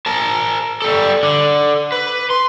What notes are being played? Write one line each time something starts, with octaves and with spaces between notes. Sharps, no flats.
A#4 A5
G3 A4
D3
B4
C6